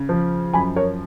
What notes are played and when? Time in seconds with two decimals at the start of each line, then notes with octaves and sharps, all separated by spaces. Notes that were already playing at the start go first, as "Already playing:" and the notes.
Already playing: C#3
0.09 F3
0.54 F#2 G#5 B5
0.76 A#4 C#5